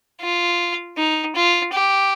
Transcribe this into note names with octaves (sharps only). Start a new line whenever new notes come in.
F4
D#4
F4
G4